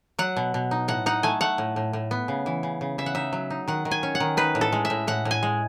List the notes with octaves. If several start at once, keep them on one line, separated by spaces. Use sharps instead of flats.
F#3 F#5
B2
B2
D#4
A2 F#5
D#4 F#5
A3 G#5
A3 F#5
A2
A2
A2
B3
C#3
E3
C#3
C#3
C#3 E5
F#5
D#4 E5
F#3
D#4
D#3 F#5
D#3
G#5
C#4
F#5
D#3
D#4 B4
A2
A4
G#3
E5
A2
A2 F#5
A2
G#5
G#3